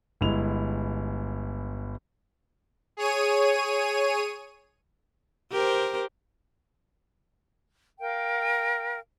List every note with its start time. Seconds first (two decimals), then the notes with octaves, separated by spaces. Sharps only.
0.21 G1 G#3 E4 F7
2.97 G#4 C#5 D#7
5.51 G4 A#4 C5
8.00 A#4 F5 G5